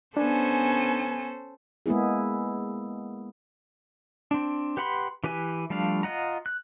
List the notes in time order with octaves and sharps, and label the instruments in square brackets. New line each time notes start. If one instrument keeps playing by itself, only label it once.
[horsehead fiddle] B3 G#5 [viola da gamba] C#4 A4 C5 [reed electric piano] D4
[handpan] G#3 A#3 B3 E4 G#4
[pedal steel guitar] C4 D4
G4 B4 F#5 B5 C6
E3 G4 B4 G#5
F3 G3 A3 D4 F5
F4 D#5 F#5 A#5
F#6